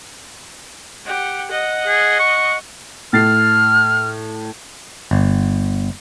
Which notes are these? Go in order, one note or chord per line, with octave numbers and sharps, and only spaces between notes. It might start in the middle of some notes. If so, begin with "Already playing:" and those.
G4 F#5
D#5 F#5
G#4
C#6
A2 F6 A6 C7
G1